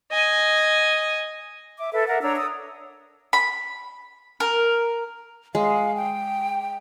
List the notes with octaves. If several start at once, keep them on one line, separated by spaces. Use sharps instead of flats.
D#5 G#5
E5 D6
A4 B4 E5
A#4 E5 F#5
D4 C#5 A#5 E6
D#6 E6
B5
A#4
G#3 F5
G5